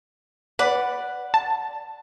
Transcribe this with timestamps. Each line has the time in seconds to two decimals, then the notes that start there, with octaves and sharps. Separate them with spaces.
0.59 B4 D5 F#5
1.34 A5